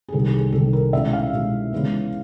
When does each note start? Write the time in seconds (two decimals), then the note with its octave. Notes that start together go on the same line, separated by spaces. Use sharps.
0.08 G#4
0.12 C2 C3 D#3 A4
0.33 G#4
0.52 C2 C3 D#3 A4
0.73 A#4
0.93 B2 G#3 C#4 E4 E5
1.13 F5
1.33 B2 G#3 C#4 E4
1.73 C#3 E3 G#3 B3